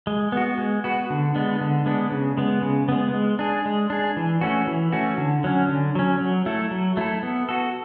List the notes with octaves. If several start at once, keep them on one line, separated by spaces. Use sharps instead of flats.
G#3
B3 F#4
G#3
B3 F#4
D3
G#3 B3 D4
D3
G#3 B3 D4
C#3
G#3 B3
C#3
G#3 B3
G#3
D4 G#4
G#3
D4 G#4
E3
A3 C#4 F#4
E3
A3 C#4 F#4
D3
F#3 C#4
D3
F#3 C#4
F#3
A3 E4 A4
F#3
A3 E4 A4
B3
F#4 A4